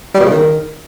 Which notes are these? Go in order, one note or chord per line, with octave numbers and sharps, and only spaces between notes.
G3
B2
C#3
D#3